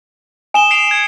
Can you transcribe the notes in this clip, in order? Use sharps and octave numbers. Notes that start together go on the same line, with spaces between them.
G#5 D#6 E7 G7
C7 D7 F7
G#6 C#7